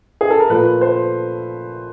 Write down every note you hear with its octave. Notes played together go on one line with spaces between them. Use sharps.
G#4
A4
A#4
A#2 F3 A3 B4
C5